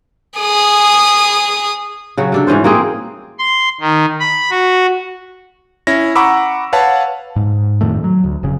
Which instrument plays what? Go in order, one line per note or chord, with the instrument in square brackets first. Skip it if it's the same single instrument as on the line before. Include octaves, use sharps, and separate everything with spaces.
[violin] G#4 D#6
[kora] C#3 F#3 F#4
C3 D4 A4
G#2 E3 C#4 C5
A#3 C4 G#4
[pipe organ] C6
D#3
B5
F#4
[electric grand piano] C#4 E4 A#6
F#5 A#5 B5 C#6 D6 E6
B4 C#5 F5 F#5 A5
[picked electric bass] G#2
F2 A2 D#3 A3
F#3
D2
F1 C#3